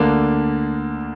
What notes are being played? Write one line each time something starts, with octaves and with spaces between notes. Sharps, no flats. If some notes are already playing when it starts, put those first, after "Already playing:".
Already playing: D2 D3 A#3 D4